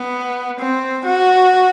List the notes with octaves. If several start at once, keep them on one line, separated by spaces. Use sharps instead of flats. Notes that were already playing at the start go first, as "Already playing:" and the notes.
Already playing: B3
C4
F#4